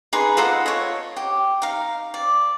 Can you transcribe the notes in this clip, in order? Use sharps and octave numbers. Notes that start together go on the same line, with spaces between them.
D#4 G#4 B4 C6
F4 A4 D#5 F#5
C#5 D#5
G4
D#4 F5
D5